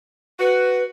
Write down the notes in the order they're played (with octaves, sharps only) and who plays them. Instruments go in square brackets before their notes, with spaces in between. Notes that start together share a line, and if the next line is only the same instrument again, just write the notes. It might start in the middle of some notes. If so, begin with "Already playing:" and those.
[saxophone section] F#4 [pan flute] B4